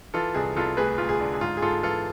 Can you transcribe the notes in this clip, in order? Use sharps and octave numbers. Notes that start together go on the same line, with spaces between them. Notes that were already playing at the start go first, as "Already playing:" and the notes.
E3 F4 A4
C2 G#4
C2 F4 A4
D2 G#4 B4
D2 F4
G#4
D3
G#4
G#2 F4
G#4
G#2 F4 A4
E3 F4 A4